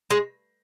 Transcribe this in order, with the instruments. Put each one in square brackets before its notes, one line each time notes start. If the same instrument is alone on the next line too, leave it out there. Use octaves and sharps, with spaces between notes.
[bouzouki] G#3